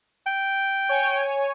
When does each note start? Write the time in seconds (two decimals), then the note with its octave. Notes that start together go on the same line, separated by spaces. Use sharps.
0.26 G5
0.89 C#5 G#5